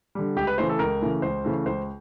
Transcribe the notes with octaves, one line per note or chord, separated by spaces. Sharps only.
D3 G3
C#2 G4
B4
C#3 E3 A3 C5
A4
C#2 A#4
C#3 E3 A3
C#2 C5
C#3 E3 A3
C#2 C5